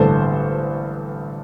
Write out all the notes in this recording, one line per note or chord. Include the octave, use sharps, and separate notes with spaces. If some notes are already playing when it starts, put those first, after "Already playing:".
Already playing: A1 G2 D3 A4 C5